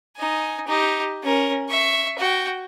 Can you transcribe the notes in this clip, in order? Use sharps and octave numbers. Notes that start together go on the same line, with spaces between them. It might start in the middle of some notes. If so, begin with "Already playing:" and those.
D#4 G#5
D#4 G4
C#4 A#4
E5 C#6
F#4 G5